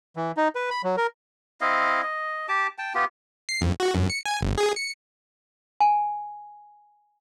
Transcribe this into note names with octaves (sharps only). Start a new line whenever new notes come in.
E3
D#4
B4
B5
F#3
A#4
C4 E4 D#5 F5
D#5
G4 A5 D6
G5 A5
B3 F4 G4
C7
F2
F#4
F#2
C#7
G#5
G1
G#4
C#7
G#5